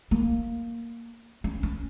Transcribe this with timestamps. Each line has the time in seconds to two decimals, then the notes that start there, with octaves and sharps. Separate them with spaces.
0.11 A#3
1.44 C#4
1.63 C#4